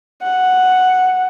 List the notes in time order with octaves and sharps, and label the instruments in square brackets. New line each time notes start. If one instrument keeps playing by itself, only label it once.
[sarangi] F#5